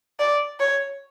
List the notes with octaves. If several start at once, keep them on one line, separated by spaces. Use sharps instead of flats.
D5
C#5